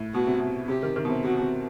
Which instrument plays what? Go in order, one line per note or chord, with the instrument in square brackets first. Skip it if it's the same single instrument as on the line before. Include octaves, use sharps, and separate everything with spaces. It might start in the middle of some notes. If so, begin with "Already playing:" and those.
Already playing: [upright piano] A2
[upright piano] B2 [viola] F#4
[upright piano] C3
B2
[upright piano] C3 [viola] G4
[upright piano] D#3
D#3
B2
C3
[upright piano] C3 [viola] F#4
[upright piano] B2
C3